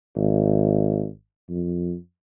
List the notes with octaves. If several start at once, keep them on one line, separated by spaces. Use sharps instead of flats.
G#1
F2